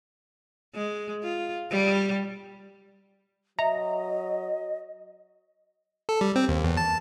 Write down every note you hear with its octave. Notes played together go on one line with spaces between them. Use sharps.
G#3
F4
G3
F#3 D#5 E5 A#5
A4
G3
C4
D#2
E2
A5